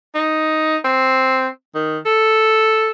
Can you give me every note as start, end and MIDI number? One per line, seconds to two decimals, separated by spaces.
0.15 0.77 63
0.85 1.47 60
1.75 1.98 51
2.06 2.90 69